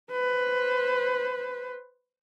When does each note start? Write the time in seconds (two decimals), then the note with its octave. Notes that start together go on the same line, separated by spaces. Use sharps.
0.11 B4 C5